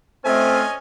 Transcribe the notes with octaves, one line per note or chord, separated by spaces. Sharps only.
A3 C4 C#4 F4 C5 D#5 G#5